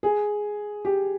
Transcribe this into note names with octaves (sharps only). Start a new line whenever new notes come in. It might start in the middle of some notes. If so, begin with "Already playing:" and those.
G#4
G4